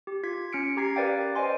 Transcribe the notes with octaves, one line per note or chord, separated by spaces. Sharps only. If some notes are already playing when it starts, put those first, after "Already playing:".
G4
F4 G#6 B6
C#4 F6 C#7 D7
G4 A#5 G#6 B6 C7
G4 A#4 B4 D5 F5 G5
C5 D5 D#5 G5 G#5 C6